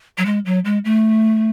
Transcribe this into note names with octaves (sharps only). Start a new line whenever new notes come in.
F#3
G#3
F#3
G#3
A3